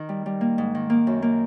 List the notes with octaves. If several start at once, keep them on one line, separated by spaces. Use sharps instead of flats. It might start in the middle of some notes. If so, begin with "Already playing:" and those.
Already playing: D#3
G3
G3
A#3
G#2
D#3
A#3
F#2
A#3